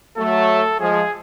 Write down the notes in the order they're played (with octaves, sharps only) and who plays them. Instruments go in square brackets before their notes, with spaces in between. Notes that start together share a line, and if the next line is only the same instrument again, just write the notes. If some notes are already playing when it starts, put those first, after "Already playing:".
[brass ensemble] F#3 A3 [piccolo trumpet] A4
[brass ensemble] F3 G#3 [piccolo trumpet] G#4